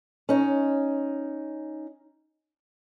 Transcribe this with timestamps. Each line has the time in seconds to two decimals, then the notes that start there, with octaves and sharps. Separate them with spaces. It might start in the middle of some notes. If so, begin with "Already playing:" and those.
0.29 C#4 D#4